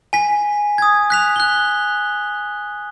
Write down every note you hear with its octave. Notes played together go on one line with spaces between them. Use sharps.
G#5 B6
D#6 G#6
F#6 B6 F7
F#6 G7